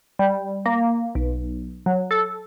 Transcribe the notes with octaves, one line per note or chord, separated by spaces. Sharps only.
G3
A#3
B1
F#3
A4